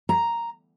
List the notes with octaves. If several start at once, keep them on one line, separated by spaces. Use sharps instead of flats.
A#5